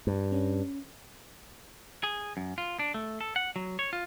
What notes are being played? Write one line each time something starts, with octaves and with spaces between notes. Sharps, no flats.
G2
C#4
G#4
F#2
F4
D4
A3
A4
F#5
F#3
C#5
F4